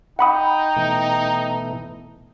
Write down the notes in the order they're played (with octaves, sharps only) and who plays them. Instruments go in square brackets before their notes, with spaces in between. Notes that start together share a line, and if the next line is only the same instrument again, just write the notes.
[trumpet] D#4 [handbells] F#5 B5 D#6 [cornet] G5
[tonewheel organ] B2 E3 A3